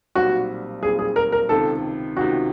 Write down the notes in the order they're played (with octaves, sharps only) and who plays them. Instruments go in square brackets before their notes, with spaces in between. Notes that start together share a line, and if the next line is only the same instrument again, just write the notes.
[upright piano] B1 A#2 G3 C4 [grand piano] F#4
[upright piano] B1 A#2 G3 C4 [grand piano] G#4
[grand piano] G#4
A#4
A#4
[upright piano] C#2 C3 D#3 [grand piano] A4
[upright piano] C#2 C3 D#3 [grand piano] F#4